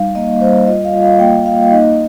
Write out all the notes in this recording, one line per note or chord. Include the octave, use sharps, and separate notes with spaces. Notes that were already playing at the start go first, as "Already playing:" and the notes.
Already playing: G3 D#4 F5
A#3 D#5
G3 C5
F4 D#5
F5
F4
F5
A#3 G5
A#3 F5
D#4 D#5